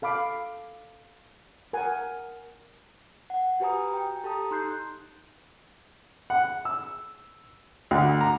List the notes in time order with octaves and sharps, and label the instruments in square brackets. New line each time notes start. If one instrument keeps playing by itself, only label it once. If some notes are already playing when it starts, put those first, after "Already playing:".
[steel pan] A4 F5 B5 D6
A#4 F#5 G#5
[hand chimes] F#5
F#4 G4 B4 G#5 A#5 D#6
G5
G4 A4 A5 A#5 D#6
D#4 C6 F#6 G6 C7
[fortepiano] F#5
E6
D2
A#5